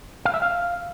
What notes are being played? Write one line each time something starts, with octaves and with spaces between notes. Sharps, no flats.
F5
E5
F5